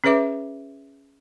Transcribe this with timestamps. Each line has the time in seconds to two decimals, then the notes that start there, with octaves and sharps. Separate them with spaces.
0.04 C#4 G#4 B4 C#5 E5 D6